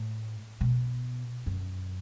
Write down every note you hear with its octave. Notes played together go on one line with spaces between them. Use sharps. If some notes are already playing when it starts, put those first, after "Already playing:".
Already playing: A2
B2
F#2